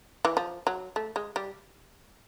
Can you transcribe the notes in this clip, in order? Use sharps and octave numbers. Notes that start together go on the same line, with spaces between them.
E3
F3
F#3
A3
G#3
G3